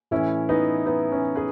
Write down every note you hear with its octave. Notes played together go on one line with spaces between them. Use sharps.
A2 E3 C#4 E4
B3 D#4
B3 D#4
C#4
G#4 B4